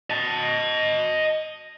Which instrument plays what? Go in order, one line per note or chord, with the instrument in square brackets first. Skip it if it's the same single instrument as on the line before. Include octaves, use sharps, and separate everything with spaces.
[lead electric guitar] D#5 A5